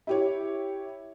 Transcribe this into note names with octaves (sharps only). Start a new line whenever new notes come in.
E4 G4 C#5